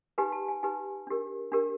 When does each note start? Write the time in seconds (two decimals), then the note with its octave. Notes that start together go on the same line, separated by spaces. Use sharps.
0.18 D#4 G4 B4 G#5
0.32 A5
0.48 G#5
0.63 D#4 G4 B4 G#5
1.07 D4 G4 A#4
1.52 D4 G4 A#4